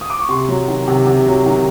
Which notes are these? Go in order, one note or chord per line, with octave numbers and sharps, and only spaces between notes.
D#6
D6
C#6
C3 C6
F#3
D#3
C3
C3
F#3
D#3